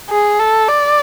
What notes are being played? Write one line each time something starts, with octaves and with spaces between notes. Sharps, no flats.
G#4
A4
D5